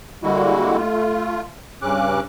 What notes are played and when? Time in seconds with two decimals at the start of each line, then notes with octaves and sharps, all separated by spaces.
0.23 D3 G3 G#3 A#3 E4 F#4
0.77 A3 F4
1.82 G2 C#3 C#4 D6 F#6